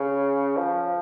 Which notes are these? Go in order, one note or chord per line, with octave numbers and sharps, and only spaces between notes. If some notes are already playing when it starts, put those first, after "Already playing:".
Already playing: C#3
F3